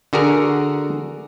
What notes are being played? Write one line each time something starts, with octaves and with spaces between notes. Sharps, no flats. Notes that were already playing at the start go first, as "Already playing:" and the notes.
D3 F#4 G#4 A#4